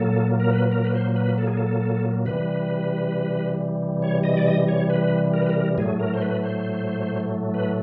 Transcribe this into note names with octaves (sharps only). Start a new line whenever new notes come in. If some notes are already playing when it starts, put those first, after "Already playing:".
Already playing: A#2 F#3 A#3 A4
A#4
B4
A#4
B4
C5
B4
A4
G#4
A4
C3 E3 G3 B4
C#5
D#5
D5
D#5
C#5
B4
A#4
B4
A#4
A2 F#3 A3 G#4
A#4
C5
B4
C5
B4